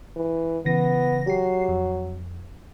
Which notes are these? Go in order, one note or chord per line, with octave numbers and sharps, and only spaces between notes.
E3
C#3 E3 B3 A#6
F#3 G4 C7
F2